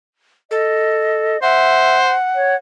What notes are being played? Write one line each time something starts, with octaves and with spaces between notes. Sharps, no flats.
A4 D#5
C5 E5 F#5
C#5